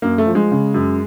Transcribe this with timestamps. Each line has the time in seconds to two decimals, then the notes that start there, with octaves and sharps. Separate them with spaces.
0.02 F#2 A#3
0.18 A3
0.26 F3
0.35 G#3
0.51 C#3
0.74 F#2